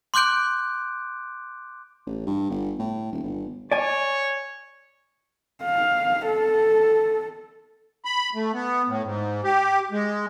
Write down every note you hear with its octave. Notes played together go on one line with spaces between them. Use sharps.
C6 D6 F#6 G6 D7
A1
G2
G1
A2
D#1
G1
C#5 D5 G#5
F5
A4
B5
A3
B3
A2
G#2
G4
G#3